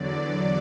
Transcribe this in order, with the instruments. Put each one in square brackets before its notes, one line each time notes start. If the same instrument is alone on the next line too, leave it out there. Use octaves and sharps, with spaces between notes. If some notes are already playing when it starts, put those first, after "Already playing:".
Already playing: [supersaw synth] E2 D3 F#3 D5